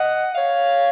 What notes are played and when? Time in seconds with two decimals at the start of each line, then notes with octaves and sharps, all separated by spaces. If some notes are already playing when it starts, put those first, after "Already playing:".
Already playing: D#5 F#5
0.33 C#5 F5